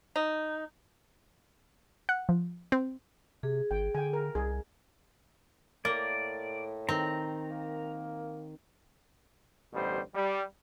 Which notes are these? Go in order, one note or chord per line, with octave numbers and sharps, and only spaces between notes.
D#4
F#5
F3
C4
C3 G#4
G#1 G5
D3 G5 G#5
A#4
C2 G#4
A2 A#3 D5
D#3 C4 A#5
A#3
A1 D2 B2 G3 C5
G3